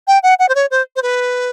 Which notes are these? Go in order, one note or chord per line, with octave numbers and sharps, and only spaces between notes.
G5
F#5
F#5
C5
C#5
C5
C5
B4